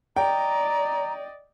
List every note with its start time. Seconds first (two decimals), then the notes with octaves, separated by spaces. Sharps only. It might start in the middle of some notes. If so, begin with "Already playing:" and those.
0.16 D5 D#5 G5 A#5